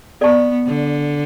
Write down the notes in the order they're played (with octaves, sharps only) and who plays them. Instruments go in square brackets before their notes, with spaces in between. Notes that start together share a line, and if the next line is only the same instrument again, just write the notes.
[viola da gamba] B3 [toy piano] A4 D5 A5 C#6
[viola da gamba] D3